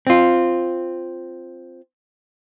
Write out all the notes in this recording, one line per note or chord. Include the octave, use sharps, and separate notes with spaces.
C4 F4